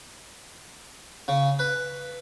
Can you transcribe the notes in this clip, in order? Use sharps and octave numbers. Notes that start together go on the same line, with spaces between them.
C#3
B4